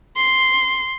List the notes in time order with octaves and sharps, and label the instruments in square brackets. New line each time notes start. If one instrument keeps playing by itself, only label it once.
[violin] C6